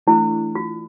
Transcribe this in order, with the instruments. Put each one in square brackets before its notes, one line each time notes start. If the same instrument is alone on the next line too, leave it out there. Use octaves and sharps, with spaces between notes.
[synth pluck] E3 A3 D4 [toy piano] E4
[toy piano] F4